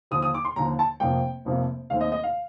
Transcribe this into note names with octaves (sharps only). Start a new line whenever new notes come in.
D#2 D3 F3 D#6
D#6
D6
C6
D#2 D3 F3 A#5
A5
F1 F2 C3 F3 A#3 G5
F1 F2 C3 F3 A#3
D#2 D#3 A3 C4 F5
D#5
D#5
F5